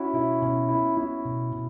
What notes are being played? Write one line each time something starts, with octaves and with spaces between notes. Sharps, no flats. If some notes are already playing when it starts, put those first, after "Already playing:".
Already playing: C#4 E4 F#4
B2 E4
B2 C#4
B3 E4
B3 E4
B2
B2